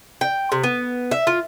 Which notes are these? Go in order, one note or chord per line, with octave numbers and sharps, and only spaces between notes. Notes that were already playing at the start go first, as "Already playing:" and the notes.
G5
C3
B3
E5
F4